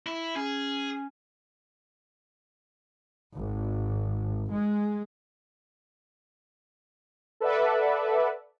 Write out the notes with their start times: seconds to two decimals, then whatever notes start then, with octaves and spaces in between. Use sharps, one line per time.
0.07 E4
0.36 C#4 G#4
3.35 G#1
4.51 G#3
7.41 A4 B4 D5 E5 F#5